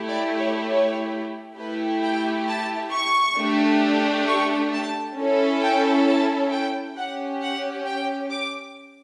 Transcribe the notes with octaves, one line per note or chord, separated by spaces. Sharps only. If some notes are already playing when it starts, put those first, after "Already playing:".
Already playing: A3 E4 G4
D5
C#5
C#5
A3 E4 G4 B4
G5
A5
C#6
A3 D4 G4
C#6
A5
C#4 E4 A4
G5
A5
G5
C#4 G4 F#5
F#5
G5
D6